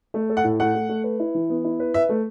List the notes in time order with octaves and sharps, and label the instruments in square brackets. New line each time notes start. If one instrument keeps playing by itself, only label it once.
[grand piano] A3
A4
[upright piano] F#5
[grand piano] A2
[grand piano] A3 [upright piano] F#5
[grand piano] A3
A3
B4
E4
E3
B3
E4
B4
[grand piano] B4 [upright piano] E5
[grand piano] A3